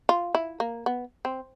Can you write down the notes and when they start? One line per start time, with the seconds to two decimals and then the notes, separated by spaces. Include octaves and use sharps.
0.09 F4
0.35 E4
0.60 A#3
0.86 B3
1.25 C4